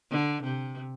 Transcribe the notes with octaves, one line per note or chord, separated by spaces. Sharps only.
D3
C3